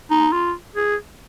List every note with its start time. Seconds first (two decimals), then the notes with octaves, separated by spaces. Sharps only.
0.11 D#4
0.32 F4
0.76 G#4